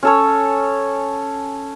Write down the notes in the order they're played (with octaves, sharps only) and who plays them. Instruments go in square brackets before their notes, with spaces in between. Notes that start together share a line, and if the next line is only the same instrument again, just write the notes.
[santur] C#4 A4 C#5